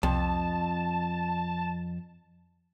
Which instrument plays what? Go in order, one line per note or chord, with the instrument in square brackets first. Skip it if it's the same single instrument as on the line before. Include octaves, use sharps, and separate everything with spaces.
[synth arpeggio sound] C2 [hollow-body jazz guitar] F2 [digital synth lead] A5